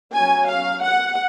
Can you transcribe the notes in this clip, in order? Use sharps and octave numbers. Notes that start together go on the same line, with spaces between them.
F#3 C#4 G#5
F5
F#5